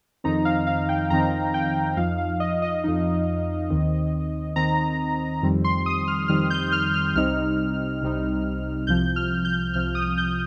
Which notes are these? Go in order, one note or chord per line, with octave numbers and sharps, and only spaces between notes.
F2 D#3 C4 D#4 A#5
F5
F5
G5
F2 D#3 C4 D#4 A#5
G5
F2 F3 D#4 F5
F5
D#5
D#5
F2 F3 D#4
D#2 D#3 C4
D#2 D#3 C4 A#5
F2 D#3 G3 C4
C6
D#6
F6
F2 D#3 G3 C4 F6
G6
F6
F6
C2 C3 G3 C4 D#4 F6
C2 C3 G3 C4 D#4
C2 C3 F3 G6
F6
G6
C2 C3 F3 F6
D#6
G6